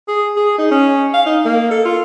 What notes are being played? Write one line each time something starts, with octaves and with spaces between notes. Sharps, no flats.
G#4
G#4
D#4
C#4
F5
D#4
A#3
A4
F4